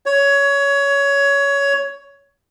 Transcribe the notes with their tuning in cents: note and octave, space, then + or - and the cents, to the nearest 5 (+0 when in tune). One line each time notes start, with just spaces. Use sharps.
C#5 +15